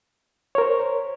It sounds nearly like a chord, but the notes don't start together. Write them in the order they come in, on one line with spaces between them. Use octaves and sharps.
C#5 A#4 C5